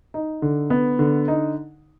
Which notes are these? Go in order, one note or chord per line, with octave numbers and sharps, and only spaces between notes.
D#4
D3
B3
D3
D#4